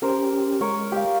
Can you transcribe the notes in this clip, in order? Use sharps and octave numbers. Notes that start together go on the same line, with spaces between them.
C#4 G4 A#4 C5
G#3 A#4 C#5
G4 F5